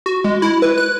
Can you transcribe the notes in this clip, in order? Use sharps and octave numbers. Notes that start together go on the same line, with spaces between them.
F#4
G#3
E4
B4
F#6